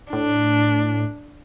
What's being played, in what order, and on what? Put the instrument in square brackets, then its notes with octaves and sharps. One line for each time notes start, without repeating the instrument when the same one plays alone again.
[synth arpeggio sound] A2 [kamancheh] D4